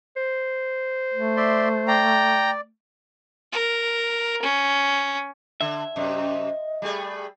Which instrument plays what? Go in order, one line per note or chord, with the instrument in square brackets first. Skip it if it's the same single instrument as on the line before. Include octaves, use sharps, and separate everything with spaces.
[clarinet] C5
[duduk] A3
[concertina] D5 E5 C6
[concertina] D5 [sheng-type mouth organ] G5 A#5
[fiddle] A#4
C#4
[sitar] D3 [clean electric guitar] E5
[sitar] F#2 C3 [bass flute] D#5
[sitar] G3 A3 G#4